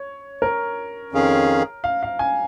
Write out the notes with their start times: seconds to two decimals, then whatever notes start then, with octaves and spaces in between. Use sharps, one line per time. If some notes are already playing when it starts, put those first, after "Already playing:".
Already playing: C#5
0.42 A#4
1.12 F2 D#3 C#4 G#4 F5
1.84 F5
2.03 F5
2.19 G#5